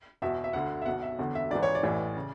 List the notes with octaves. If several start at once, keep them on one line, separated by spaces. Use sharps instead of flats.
E1 E2 B2 E5
E5
D2 D3 F#5
E5
B1 B2 F#5
E5
E1 E2 D3
E5
G#1 G#2 E3 D5
C#5
D5
A1 A2 E3
C#3